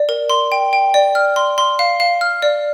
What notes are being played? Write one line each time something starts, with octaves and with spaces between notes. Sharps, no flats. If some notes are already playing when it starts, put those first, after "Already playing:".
Already playing: D5
A#4
C6
G5
G5
D5
F6
C6
C6
F5
F5
F6
D5